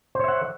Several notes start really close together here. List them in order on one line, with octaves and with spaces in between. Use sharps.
C5 C#5 E5 F#5